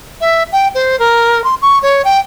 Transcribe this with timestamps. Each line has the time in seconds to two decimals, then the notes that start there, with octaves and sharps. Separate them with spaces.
0.21 E5
0.52 G5
0.75 C5
0.99 A#4
1.44 C6
1.62 C#6
1.83 C#5
2.05 G5